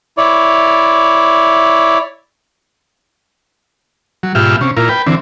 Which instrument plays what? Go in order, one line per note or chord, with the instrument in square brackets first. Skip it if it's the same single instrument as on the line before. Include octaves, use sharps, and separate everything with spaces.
[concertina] E4 C#5 D5
[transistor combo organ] F#3
G#2 B2 F4 G4 E5 F6
C3 C#4
A#2 E4 F4 A#4
B4 G5
D3 E3 C4